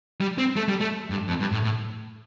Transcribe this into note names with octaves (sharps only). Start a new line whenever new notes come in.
G3
C4
A3
G3
A3
G2
F2
G2
A2
A2